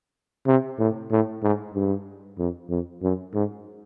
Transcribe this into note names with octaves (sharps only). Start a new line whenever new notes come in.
C3
A2
A2
G#2
G2
F2
F2
F#2
G#2